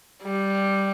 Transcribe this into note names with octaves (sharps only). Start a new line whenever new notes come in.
G3